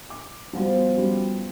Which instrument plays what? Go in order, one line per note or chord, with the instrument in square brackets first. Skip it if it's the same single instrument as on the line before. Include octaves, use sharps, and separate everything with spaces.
[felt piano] D6
[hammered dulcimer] F3 B3 F4 [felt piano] G3 F#4
[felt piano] G3 C#4 F#4